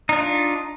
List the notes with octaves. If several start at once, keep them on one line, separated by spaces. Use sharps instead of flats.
D4 D#4 F4